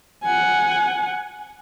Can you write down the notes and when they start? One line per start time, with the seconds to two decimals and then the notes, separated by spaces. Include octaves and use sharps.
0.24 F#5 G#5